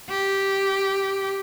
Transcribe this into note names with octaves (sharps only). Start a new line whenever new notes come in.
G4